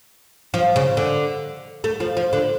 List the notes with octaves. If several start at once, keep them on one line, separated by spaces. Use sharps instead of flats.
F3
C#3
D3
A3
F3
F3
D3